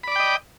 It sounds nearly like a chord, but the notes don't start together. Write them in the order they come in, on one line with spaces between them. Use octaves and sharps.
B5 D5 D6 G5 D#5